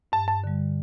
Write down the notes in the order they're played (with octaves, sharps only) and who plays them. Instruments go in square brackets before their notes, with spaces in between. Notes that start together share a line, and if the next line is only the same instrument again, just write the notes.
[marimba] G2 [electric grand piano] A5
[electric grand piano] A5
[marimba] D3 G3